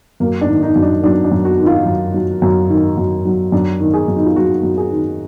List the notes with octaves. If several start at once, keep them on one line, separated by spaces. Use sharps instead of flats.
F#2 A#3
D4
D#3
D#4
F#2
D4
F#3 D4
D4
F#2
F#4
D#3
F4
F#2
F#3
F#2
D#3
F#2
F#3
F#2 D4
D#3
G#4
F#2
D#4
F4
F#3 F#4
F#2
G#4
D#3